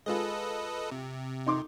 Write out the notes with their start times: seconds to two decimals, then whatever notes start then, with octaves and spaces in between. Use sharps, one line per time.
0.06 G#3 F4 A4 B4 D#5
0.91 C3
1.46 D#4 C6 D6